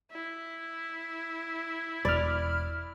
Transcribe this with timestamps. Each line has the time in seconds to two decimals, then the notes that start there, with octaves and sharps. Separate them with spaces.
0.11 E4
2.05 E1 D5 B5 F6